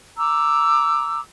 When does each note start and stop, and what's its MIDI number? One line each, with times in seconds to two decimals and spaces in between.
0.17 1.21 82
0.17 1.21 86
0.17 1.21 88